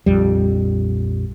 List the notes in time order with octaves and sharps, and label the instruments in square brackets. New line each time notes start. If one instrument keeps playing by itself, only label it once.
[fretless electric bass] A#1 F2 G3